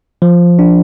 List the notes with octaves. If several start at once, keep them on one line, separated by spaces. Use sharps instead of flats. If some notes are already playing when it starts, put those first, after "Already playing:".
F3
D4